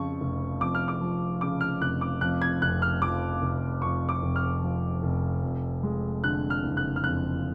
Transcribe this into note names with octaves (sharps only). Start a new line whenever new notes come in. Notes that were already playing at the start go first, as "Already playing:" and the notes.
Already playing: F2 C#3 F3 C#6
F1
F2 D6
F6
D6
F3
C#3 D6
F6
F1 F#6
D6
F2 F#6
G#6
F1 F#6
F6
F3 D6
F1
F2 C#6
D6
F1
F6
F3
F1
F2
G#3
D3 F#6
F6
F#1
F#6
F6
F2 F#6